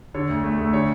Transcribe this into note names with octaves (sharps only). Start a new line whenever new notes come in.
D3 C#5
D2
A3
D2
D3 C#5